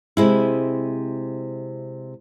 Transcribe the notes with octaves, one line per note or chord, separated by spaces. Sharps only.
C3 G#3 E4